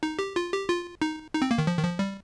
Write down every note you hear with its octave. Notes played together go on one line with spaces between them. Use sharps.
D#4
G4
F4
G4
F4
D#4
D#4
C4
A#3
D#3
F3
D#3
F3
G3